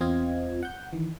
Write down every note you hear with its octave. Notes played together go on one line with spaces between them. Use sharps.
E2 C4 F4 D#5 F5 G#6
F#5 G6
D#3 E3